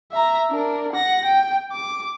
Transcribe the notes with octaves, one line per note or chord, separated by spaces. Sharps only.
E5 A#5
D4 A#4
F#5 A#6
G5
D6